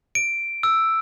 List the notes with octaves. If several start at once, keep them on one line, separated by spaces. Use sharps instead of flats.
D7
E6